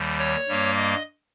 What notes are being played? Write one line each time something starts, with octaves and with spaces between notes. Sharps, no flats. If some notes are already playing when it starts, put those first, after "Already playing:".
Already playing: D#2 D#3 G3
C#5
G2 G3 A#3
D#5